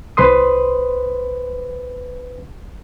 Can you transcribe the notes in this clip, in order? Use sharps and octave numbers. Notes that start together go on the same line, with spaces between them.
C2 B4 C5 C6 D#6